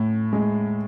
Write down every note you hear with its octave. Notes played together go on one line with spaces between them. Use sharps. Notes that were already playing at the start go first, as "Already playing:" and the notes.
Already playing: A2
G#3